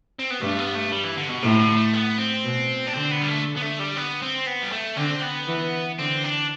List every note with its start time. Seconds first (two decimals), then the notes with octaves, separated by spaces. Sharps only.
0.19 C4
0.30 B3
0.41 G2 A3
0.59 B3
0.75 A3
0.92 G3
1.04 E3
1.18 D3
1.29 B2
1.43 A2 C3
1.59 D3
1.76 A3
1.93 B3
2.18 C4
2.44 B2
2.87 D4
2.94 D3 C4
3.12 B3
3.22 G3
3.28 A3
3.56 B3
3.62 A3
3.79 G3
3.96 B3
4.22 C4
4.46 B3
4.62 G3
4.72 A3
4.97 D3 C4
5.23 B3
5.48 E3
5.99 D3 C4
6.24 D4